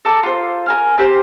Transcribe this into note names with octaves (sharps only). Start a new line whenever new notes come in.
A4 A#4 A5 D6
F4 C5
A#4 G#5 F6
C4 G4 C5